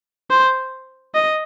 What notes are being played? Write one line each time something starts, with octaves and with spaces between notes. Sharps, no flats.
C5
D#5